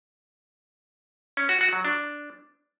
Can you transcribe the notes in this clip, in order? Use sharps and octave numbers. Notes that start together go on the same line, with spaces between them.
C#4
F#4
F#4
F#3
D4